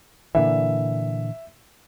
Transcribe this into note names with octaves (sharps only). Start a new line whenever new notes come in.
A#2 D3 E3 E5